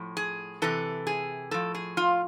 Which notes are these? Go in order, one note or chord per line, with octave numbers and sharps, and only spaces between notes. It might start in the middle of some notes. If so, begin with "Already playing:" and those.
Already playing: A2 F3
G#4
C3 E3 A4
G#4
A2 F3 A4
G#4
F4